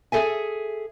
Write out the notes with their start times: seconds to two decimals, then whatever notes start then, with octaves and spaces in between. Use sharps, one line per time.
0.12 G#4 A4 E5 G#5